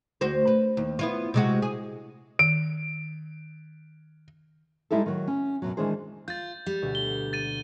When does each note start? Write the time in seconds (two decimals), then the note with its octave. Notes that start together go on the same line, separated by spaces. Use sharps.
0.21 D2 F#4 C5
0.47 B4
0.77 D#2
0.99 B3 E4 F4
1.34 C3 G#3 F#4
1.62 G#4
2.39 D#3 D7
4.90 G3 G#3 D#4 E4 G4 A4
5.06 D#3 F#3
5.27 C#4
5.62 F#2 B2 F#3
5.77 D#3 E3 G#3 D4 G#4 C5
6.28 F4 G6 A6
6.66 G3
6.82 D2 B2
6.95 G7
7.33 A6 D#7